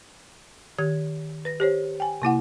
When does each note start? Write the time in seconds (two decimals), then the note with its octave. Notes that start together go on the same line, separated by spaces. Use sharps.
0.78 D#3 G4 G#6
1.45 B4 A#6
1.60 G4 C5 C#5
2.00 G5 G#5
2.22 C3 A#3 E4 F#5